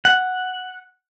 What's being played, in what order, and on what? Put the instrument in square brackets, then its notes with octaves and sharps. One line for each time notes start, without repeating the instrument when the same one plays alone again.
[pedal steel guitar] F#5